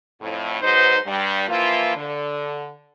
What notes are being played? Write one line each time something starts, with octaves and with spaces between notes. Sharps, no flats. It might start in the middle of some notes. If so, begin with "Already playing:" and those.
F2 A2
G#2 F#3 D#4 B4 C5
G2 G3
E3 F3 A#3 E4 F4
D3